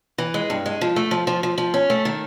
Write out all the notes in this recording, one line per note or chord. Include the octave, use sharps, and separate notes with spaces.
E3
G#3
G2
G#3
F3
A3
F3
F3
F3
F3
C#4
A3
D#3